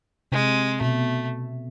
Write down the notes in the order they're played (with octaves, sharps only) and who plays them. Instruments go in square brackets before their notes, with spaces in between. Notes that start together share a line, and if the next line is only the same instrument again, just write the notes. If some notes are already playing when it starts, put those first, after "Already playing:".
[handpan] C3 [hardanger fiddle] G#3
[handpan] B2 [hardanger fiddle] A3